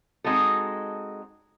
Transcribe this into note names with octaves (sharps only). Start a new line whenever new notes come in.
G#3 C4 D#4 F#4 A4